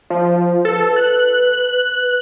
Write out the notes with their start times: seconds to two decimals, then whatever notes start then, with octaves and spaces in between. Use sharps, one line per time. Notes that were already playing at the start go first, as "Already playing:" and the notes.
0.10 F3
0.65 A4 B4
0.96 F#6